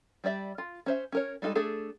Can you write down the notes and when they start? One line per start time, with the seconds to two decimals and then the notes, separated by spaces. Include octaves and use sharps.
0.24 G3 G4 D5 E5
0.58 F4
0.86 C#4 C5 E5
1.12 C#4 A#4 C#5
1.42 G3 G#3 D#4 F4 A4
1.55 A3 D4 G#4 A4